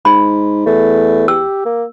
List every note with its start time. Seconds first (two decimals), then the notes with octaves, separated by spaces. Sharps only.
0.05 G#2 B5
0.66 E2 A3
1.28 G4 E6
1.66 A#3